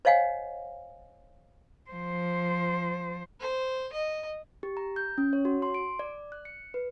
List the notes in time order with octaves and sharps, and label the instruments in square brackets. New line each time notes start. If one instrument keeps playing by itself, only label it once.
[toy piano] C5 C#5 D#5 F5 F#5 G#5
[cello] F3 C5
[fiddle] C5
D#5
[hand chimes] G4
A#5
G6
C#4
C#5
F#4
C6
D7
D5
F#6
C#7
B4